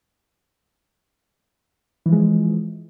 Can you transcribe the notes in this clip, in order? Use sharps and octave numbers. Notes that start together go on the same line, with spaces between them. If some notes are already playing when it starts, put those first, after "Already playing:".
E3 F3 G#3